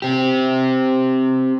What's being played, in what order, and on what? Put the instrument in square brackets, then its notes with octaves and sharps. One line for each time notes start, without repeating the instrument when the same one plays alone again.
[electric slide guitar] C4 G4